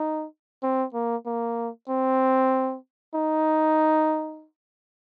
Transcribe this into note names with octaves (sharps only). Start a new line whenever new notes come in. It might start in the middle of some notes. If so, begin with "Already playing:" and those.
Already playing: D#4
C4
A#3
A#3
C4
D#4